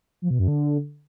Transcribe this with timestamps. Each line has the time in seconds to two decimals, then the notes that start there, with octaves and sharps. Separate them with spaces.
0.22 F3
0.31 B2
0.39 F#2
0.48 D3